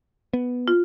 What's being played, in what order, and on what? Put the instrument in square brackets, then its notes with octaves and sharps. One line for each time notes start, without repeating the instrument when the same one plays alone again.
[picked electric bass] B3
[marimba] F4